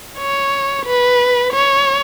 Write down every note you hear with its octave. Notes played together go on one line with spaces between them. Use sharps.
C#5
B4
C#5